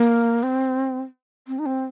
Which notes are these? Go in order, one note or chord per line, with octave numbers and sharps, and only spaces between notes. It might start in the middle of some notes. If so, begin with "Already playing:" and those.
Already playing: A#3
C4
C4
D#4
C4